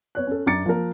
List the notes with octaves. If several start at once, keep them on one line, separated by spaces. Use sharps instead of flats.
B3 C#5 F#6
C#4 A4
F#2 D4 A#5 D6 A6 C#7
F3 A#3 A#4